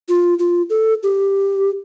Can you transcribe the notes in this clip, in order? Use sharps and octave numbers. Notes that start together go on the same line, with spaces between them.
F4
F4
A4
G4